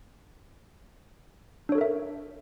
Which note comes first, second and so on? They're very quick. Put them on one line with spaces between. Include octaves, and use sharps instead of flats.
D4 C#5 A4 A#4 E5